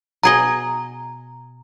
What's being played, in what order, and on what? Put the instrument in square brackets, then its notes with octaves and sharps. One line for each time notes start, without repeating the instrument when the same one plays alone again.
[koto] B2 G#4 D#5 [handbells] A#5